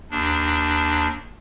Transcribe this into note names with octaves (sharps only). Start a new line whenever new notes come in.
D#2 D4